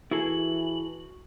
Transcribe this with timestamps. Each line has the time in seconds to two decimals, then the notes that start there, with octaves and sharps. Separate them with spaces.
0.11 E3 E4 F#4 G#4 A4 F#7